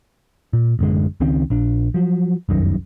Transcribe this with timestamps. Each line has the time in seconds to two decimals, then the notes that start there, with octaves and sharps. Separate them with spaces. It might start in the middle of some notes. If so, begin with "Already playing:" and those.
0.53 A#2
0.79 A1 F#2 D3 G#3
1.20 C#2 D#3 C4 C#4
1.50 A#1 D4
1.94 F3 F#3
2.49 F1 C2 F#2 D#3